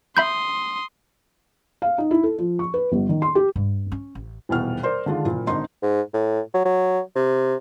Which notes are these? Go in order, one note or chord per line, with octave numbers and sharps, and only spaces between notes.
E5 B5 C6 D#6 G6
F5
D#4
E4
A4
F3
C#6
B4
G1
D#3
C6
G4
G2
C#4
A1
D#1 E2 B2 F6
A#4 C5 D5 C6
D3 D#3 G#3 D4 F4
F#1 A#2
G#1 D3 D#4 C6
G#2
A2
F#3
F#3
C3